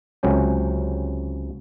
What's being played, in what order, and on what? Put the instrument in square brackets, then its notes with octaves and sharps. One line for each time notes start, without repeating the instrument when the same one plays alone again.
[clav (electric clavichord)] C#2 C3 F#3 C#4 G5